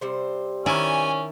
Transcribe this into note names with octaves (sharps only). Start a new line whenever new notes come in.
C3 G3 C5
D#3 C#4 E4 D5 G#5